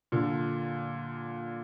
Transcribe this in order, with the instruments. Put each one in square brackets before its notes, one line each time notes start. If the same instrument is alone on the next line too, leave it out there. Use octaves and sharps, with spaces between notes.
[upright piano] A#2 D3